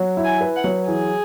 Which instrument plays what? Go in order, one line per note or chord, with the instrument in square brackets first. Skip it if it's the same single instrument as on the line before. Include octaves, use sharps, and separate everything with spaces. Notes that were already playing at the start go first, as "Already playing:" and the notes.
Already playing: [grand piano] F#3
E4
[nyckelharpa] G#5
[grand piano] B4
[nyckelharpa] F#5
[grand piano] F#3
[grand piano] E3 [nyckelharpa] G#4